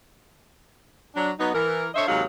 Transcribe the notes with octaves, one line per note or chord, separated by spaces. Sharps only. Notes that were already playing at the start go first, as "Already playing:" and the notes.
F#3 D4
F#3 B3 D#4
E3 A#4
D4 A4 C5 C#5 D#5 E5
D#2 C3 F#3 G#3 D#4 F5